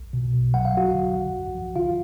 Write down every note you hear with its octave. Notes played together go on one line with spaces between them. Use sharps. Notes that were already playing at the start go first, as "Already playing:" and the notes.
Already playing: B1
B2
B1
F#3 F#5
F5
F#3 F#4 F#5
D3
B1
B1
F3
D3 F4 F5